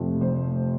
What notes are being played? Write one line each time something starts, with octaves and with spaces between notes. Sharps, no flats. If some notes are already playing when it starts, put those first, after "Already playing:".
Already playing: F1 F2 C3 F3 A3
F1 C5